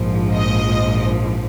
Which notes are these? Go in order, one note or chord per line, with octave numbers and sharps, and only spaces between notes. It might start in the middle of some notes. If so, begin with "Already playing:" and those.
Already playing: A#1 G#2 F3
D#5